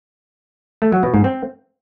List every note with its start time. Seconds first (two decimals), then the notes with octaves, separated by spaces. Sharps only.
0.82 A3
0.92 F#3
1.03 B2
1.14 G#2
1.24 C4